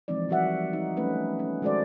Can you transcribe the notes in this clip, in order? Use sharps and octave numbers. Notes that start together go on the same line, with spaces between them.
E3 F3 G#3 C4 D#4 D5
F3 G3 F#4 A#4 E5 F#5
D#4
F#3 A3 C#4 B4
B3 C#4
D#3 G#3 F#4 A4 C5 D5